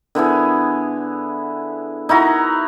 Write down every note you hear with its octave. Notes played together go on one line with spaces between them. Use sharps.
D3 B3 E4 G#4
D#4 E4 F#4 A#5